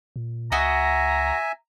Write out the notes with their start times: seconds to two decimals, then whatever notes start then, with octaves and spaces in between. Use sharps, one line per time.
0.16 A#2
0.52 C#2 F#4 D#5 E5 G#5 A#5